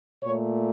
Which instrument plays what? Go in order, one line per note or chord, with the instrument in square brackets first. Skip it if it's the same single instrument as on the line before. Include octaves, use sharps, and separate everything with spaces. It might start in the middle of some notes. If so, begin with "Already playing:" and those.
[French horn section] A#2 A3 C#5